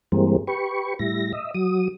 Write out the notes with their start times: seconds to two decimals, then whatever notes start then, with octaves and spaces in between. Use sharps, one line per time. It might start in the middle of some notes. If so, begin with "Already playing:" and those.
0.12 G2 E3 G3 G#3 A#3 C4
0.47 G4 B4 C#6
0.99 A2 G3 E4 A#6
1.33 D#5 E5
1.54 F#3 D#6